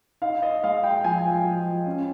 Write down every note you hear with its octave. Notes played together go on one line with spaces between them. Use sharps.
D#4 F5
D#5
G#3 F5
G5
F3 G#5
F3
C#4